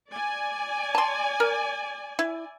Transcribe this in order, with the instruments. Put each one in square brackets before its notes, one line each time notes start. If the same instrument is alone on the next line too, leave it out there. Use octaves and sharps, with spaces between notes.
[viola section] D5 G#5
[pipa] A5 C6
A#4
E4